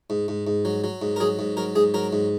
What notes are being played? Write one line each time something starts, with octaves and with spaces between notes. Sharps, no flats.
G#2
G#2
G#2
F#3
F#3
G#2
A#4
F#3 G#4
G#2
F#3 A#4
G#2 G#4
F#3 A#4
G#2